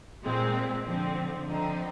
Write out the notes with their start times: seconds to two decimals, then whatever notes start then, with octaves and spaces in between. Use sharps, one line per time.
0.23 A#2 G#3 C4
0.84 D3 F3 C4
1.46 D3 F3 C4 D#4